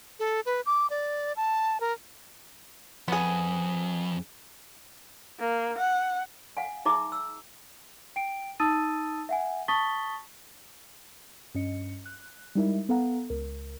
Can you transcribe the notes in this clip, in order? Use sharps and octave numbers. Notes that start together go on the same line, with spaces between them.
A4
B4
D6
D5
A5
A#4
F2 B3 G#4
A#3
F#5
F5 F#5 G#5
D#4 G#4 E5 A#5 D6
E6
G5 D7
D#4 A5 D#6 E6 A6 D#7
E5 F#5 G#5
A5 C#6 D#6 A6 B6 G7
G2 C#4 D#5 C#7
F#6
G3 G#3 D#4 E4 A#4 E5
B3 A4 F5 F#5 A#5
C#2 A#4